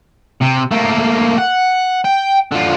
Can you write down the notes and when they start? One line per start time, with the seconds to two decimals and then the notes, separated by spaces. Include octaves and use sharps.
0.42 C3
0.71 A3 A#3
1.38 F#5
2.04 G5
2.52 D3 F4